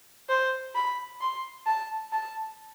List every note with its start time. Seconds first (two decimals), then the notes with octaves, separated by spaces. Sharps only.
0.29 C5
0.75 B5
1.21 C6
1.66 A5
2.13 A5